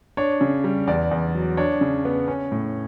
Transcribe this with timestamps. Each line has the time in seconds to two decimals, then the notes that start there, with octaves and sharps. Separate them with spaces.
0.17 D4 C#5
0.41 C#3
0.64 G3
0.87 E2 D5
1.11 E2
1.35 F#3
1.57 D4 C#5
1.81 C#3
2.05 B3
2.28 C#4
2.52 A2